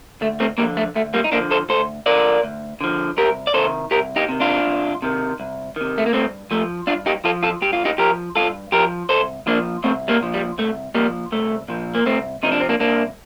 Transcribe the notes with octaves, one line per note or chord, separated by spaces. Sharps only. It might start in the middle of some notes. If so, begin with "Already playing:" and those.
D2 A3
A3 C4
D3 F3 G3 A#3
A3
D2 A3
G3 A#3
D#4
D3 F3 A#3 D4
A4 C5
D2 A4 C5
D3 F3 A#4 D5
D2
D3 F3
C2 G4 A#4
D5
C3 D#3 A4 C5
C2 G4 A#4
D#4 G4
C3 D#3
D4 F4
C2
C3 D#3
C2
C3 D#3
A3
A#3
G2 A3 C4
F3 A3
G2 D4 F4
D#4 G4
F3 F4 A4
F4 A4
G2 G4
F4
D#4 G4
F3 G4 A#4
G2 F4 A4
F3 G4 A#4
C2 A4 C5
A#2 F3 A#3 D4
C2 A3 C4
G3 A#3
A#2 F3
G3
C2 A3
A#2 F3 G3 A#3
C2 A3
A#2 F3
A#3
C2 A3 C4
C3 F3 D#4
D4
C4
A#3 D4
C2 A#3 D4